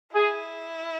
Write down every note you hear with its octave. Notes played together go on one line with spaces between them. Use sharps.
E4 G#4